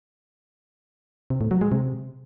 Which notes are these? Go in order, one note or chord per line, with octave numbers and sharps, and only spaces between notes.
C3
A2
F#3
G#3
C3